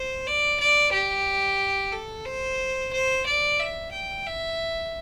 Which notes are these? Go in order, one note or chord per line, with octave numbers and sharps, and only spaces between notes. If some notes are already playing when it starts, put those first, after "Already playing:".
Already playing: C5
D5
D5
G4
A4
C5
C5
D5
E5
G5
E5